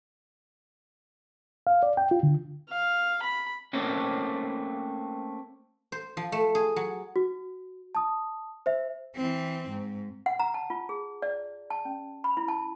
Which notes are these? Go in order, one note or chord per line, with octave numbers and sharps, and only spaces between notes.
F5
D5
G5
F4
D3
F5
B5
A3 A#3 C4 C#4
C5
F3
A3
G#4
F#3
F#4
A5 D#6
C5 E5
E3 C4
G#2
F#5
A#5
A5
F4
G#4
D5
A5
C#4
B5
E4
A5